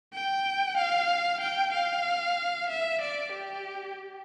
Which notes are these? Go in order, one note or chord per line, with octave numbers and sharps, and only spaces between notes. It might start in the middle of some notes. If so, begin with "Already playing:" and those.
G5
F5
G5
F5
E5
D5
G4